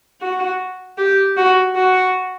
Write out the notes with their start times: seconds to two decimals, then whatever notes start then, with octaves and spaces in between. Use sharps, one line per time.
0.21 F#4
0.98 G4
1.37 F#4
1.75 F#4